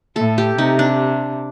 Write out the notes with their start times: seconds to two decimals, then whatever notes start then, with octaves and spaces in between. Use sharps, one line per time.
0.16 A2 A4
0.38 G4
0.58 C3 D#4
0.79 D4